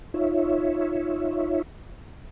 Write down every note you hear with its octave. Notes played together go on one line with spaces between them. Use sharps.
D#4 F4 C#5 E5